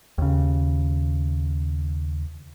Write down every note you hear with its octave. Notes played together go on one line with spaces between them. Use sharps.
D#2 C#3